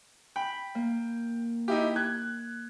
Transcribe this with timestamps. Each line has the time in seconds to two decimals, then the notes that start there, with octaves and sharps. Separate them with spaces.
0.36 G5 B5
0.75 A#3
1.68 D#4 E4 G4
1.96 F#6 G#6